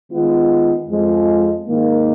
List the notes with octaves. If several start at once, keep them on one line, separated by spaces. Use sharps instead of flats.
D#3 G#3 B3 F4
F2 F3 G#3
G#2 D#3 A#3